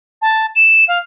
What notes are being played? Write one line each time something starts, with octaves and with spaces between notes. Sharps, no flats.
A5
E7
F5